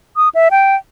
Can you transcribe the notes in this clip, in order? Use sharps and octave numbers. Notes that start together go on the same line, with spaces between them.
D#6
E5
G5